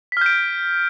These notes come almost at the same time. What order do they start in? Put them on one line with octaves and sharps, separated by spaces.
B6 F6 G6 D7